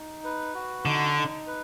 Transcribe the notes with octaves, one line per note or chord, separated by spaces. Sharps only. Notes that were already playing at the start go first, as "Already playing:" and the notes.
Already playing: D#4
B4
F#4
D3 D#4
D#4
B4